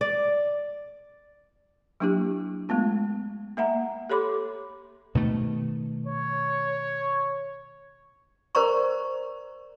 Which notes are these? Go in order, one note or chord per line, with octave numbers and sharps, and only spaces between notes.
D5
F#3 A#3 D4 E4 G4
G#3 A3 B3 F4
A#3 E5 F#5 A#5
G4 A4 C#5 B5 C6 D6
B2 D#3 A3
C#5
A#4 C5 D5 A#5 C#6